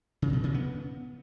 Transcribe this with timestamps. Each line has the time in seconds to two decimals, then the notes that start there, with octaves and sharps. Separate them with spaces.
0.22 C#3
0.33 B2
0.44 C#3
0.54 B3